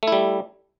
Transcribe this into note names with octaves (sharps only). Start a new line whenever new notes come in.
G3 A3 E4